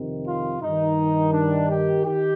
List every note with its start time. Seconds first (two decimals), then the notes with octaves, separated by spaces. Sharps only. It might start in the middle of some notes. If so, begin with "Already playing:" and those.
Already playing: F2 C3 D#3
0.26 F4
0.62 G2 D#3 D#4
1.33 D4
1.69 G4
2.05 D#3 G4